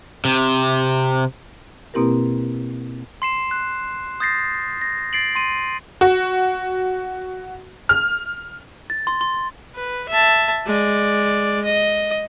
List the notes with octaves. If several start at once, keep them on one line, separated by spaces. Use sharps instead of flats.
C3
B2 A#3 C4 E4 G4 A#4
C6 C7 E7
F#6
D#6 G6 A6 A#6 C7
A#6
A6 C7 D7 F#7
C6 D#7
F#4
F6
A6
C6
C6
B4
E5 A5
G#3 D5
D#5